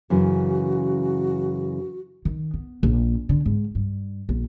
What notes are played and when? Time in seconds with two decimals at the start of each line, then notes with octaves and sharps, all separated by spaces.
0.10 F#2 C#3 E3 F#4
2.25 D#3
2.54 B3
2.83 A#1
3.29 D3
3.46 G#2
3.75 G2
4.29 A#1